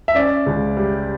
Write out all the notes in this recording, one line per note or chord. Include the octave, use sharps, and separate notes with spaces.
E5
C#4 D5
C#2
G3